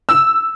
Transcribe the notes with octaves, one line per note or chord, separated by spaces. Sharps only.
E6